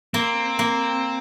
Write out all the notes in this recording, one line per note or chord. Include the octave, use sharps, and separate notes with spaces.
A#3 C4
A#3